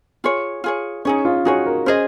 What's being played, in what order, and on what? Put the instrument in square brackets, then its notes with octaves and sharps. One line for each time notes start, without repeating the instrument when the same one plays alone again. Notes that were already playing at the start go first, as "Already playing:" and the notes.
[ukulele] F4 G#4 C#5
F4 G#4 C#5
[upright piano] C#4 [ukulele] D#4 G#4 C#5
[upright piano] F4
[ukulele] D#4 G#4 C#5 [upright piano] F#4
[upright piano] A#4
[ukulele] C#4 G#4 D#5 [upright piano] C5